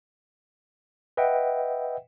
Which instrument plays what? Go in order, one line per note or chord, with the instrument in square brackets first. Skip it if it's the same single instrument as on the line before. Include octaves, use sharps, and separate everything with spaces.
[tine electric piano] B4 D#5 E5 F#5 G5